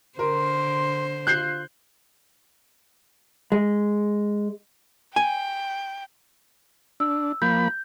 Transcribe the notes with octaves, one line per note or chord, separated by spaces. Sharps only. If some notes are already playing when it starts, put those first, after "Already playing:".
D3 A#4 C5 C6
F4 F#6 G6 C7
G#3
G5 G#5
D4 E6
F3 A#3 B5 G6